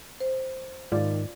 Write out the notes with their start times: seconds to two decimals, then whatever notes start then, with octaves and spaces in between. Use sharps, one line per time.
0.20 C5
0.92 G#2 D#3 F4 D5